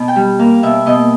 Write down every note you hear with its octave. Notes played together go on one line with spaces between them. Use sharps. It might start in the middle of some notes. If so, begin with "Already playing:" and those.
Already playing: B2
G5
G3
A#3 F5
B2 E5
B2 D#5